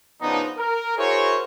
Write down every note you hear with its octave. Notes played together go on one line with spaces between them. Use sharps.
C#3 F3 B3 D4 D#4
A#4
E4 F#4 G#4 A#4 C5 C#5